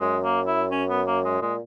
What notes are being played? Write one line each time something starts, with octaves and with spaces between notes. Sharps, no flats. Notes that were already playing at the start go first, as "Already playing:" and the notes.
F#2 G#3
A#3
E4
C#4
B3
A#3
G#3
A#2 G#3